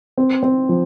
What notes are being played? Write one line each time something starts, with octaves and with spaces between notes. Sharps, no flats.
C4
C4
F3